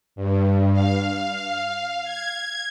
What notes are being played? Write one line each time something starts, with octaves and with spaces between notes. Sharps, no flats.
G2
F5
G#6